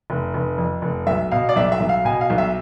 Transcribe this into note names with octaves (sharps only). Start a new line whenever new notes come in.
F1
F1
F2
F1
B1 E5
B2 F5
D5
B1 E5
E5
B1
F5
B2 G#5
F5
B1
E5